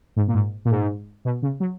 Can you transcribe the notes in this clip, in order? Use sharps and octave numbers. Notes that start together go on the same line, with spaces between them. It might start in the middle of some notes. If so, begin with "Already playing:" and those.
G#2
A#2
G#2
A#2
G#2
B2
C#3
F#3